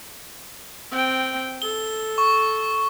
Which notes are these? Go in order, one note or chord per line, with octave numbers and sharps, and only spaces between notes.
C4 G5
A4 G7
C#6